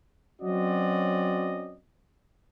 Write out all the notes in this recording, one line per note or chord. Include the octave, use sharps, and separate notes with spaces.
F#3 C4 C#4 F#4 D5 D#5